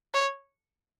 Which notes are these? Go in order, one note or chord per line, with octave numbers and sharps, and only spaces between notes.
C#5